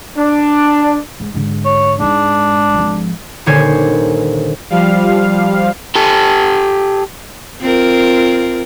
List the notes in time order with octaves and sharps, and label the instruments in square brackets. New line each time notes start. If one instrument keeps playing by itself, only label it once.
[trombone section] D4
[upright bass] G#2
G#2 D3
[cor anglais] C#5
[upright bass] G#2 G#3 [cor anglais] D4
[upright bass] G#1 F3
[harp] D#1 D3 C5 C#5 G#5
[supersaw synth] F3 G3 F5
[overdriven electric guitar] G4 A4
[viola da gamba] C4 F4 A#4